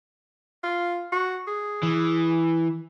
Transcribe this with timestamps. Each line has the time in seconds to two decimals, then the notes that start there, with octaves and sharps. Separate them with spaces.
0.63 F4
1.12 F#4
1.47 G#4
1.83 E3